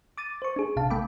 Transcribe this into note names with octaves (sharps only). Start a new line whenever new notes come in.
D6 A6 D#7
C5 C#6
D4 G#4
A#1 C3 F5 A5
A3 G5 B5 D6